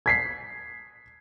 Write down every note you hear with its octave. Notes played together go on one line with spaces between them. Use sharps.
G#6 B6 C7